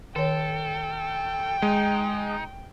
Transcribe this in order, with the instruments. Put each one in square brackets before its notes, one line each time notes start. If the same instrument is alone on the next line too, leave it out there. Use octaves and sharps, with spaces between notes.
[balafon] D#3 C#5 [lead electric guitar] A4 [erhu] G5
[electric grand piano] G#3 [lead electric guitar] D#4